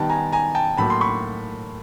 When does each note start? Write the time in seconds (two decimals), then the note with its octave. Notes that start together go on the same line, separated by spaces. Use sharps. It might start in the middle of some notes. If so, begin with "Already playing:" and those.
Already playing: D#3 G3 B3 G5 A5
0.10 G#5 A#5
0.33 G#5 A#5
0.55 G5 A5
0.77 A2 F#3 A#3 A5 B5
0.90 C6
1.01 B5 C#6